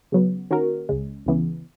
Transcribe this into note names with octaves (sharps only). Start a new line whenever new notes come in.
C#3 F#3 B3
D#3 A#3 C#4 F#4 A#4
C#2 C#3 G#3
C#2 C#3 E3 B3